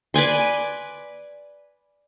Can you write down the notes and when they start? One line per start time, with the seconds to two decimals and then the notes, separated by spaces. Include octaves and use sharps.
0.14 B4 D5 G#5 C6